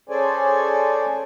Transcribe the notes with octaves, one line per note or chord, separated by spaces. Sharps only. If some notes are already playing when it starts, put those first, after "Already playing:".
C#4 G#4 A4 C5 D5 G#5